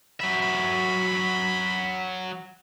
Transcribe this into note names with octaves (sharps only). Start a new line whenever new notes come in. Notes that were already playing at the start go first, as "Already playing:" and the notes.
F#3 E5 B5
B5